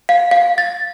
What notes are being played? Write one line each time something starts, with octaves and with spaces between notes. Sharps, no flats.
F5
F5
A6